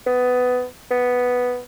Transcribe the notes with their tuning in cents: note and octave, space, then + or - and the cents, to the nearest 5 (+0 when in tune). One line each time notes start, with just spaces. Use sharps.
B3 +15
B3 +0